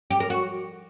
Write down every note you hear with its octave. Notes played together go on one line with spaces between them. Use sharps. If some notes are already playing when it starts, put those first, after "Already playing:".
G4
A#4
F#4